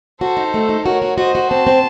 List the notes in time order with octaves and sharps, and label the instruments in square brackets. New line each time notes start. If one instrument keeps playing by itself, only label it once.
[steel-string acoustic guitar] F#4 [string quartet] A4 C5
[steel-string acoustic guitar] D#4
A3
D#4
[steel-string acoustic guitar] F#4 [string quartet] A#4 C#5
[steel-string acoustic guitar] F#4
[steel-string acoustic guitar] F#4 [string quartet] C5 D#5
[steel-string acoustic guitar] F#4
[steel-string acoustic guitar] C4 [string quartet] A5 C6
[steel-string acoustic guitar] C4